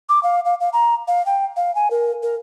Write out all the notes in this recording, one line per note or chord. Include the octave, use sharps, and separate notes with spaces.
D6
F5
F5
F5
A#5
F5
G5
F5
G#5
A#4
A#4